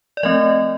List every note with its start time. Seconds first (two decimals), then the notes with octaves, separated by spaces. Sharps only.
0.17 D5
0.23 F3 A3 C4 D#5